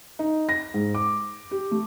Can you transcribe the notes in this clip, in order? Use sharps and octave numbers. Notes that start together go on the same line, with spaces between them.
D#4
A#6
G#2
D6
G4
A3